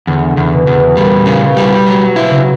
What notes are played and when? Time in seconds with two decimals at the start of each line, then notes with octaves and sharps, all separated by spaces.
0.07 E2 D3
0.30 C#3
0.37 E2
0.53 B2
0.67 E2
0.75 B2
0.97 A#2 G3
1.26 C#3
1.41 B2
1.57 G3
1.87 F#3
2.16 E4
2.31 C#3